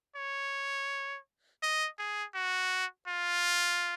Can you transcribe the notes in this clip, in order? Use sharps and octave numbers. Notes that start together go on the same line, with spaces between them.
C#5
D#5
G#4
F#4
F4